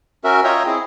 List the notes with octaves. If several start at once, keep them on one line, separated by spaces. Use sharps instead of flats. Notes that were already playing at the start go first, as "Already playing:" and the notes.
C#4 F#4 A#4 E5
F4 C#5 D#5 E5 G5 A#5
C4 E4 G#4